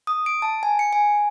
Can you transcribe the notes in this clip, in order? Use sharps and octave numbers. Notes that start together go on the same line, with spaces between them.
D#6
D7
A5
G#5
C#7
G#5